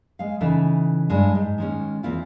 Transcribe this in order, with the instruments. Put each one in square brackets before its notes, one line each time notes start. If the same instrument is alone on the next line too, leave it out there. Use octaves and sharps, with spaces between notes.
[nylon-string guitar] G#3 F5
C#3 E3 D#4 E4 A4
G2 G#3
G#2
D#3 G#3 C#4
E2 C4 E4 F4